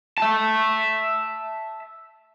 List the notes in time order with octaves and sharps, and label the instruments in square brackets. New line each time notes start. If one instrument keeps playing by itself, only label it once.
[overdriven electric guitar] E5 A5